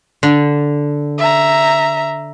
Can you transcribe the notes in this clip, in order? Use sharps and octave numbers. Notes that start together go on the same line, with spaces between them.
D3
E5 A#5